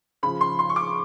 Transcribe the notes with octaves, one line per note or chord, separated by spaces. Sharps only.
C#3 F3 B5
C6
C6
C#6
D6